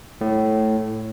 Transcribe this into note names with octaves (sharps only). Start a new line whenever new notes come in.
A2